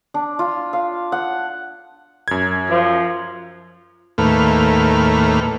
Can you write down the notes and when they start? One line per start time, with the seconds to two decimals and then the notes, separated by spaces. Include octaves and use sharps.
0.14 D4
0.39 F4
0.73 F5
1.12 F#5
2.28 F#2 G#6
2.70 F3
4.18 D#2 A2 A3 A#3 B4 F6